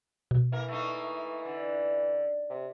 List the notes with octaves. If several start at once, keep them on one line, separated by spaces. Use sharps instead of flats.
B2
E3 A#3 A#4
A3 A#3 D#4
D3
C3